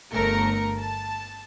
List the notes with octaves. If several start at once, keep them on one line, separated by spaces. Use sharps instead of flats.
G1 A3 A#4 C#7
A5